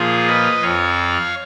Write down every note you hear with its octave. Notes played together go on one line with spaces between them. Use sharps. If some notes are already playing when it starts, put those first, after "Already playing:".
Already playing: A#2 F3 F4 G#4
B4 D#5
F2 F3 C#5 F5